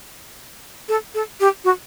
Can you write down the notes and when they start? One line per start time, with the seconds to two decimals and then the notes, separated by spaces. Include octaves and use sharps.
0.88 A4
1.14 A4
1.40 G4
1.64 F#4